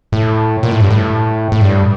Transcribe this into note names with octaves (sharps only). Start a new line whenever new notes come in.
A2
A#2
A2
G2
A2
A2
G2